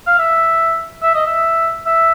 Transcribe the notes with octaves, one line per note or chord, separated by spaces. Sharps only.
F5
E5
E5
D#5
E5
E5